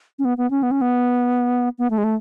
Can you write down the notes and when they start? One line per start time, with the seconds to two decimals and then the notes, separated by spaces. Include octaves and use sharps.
0.19 C#4
0.25 B3
0.38 B3
0.51 C#4
0.63 B3
0.71 C#4
0.81 B3
1.79 B3
1.90 A3
1.98 G#3
2.04 A3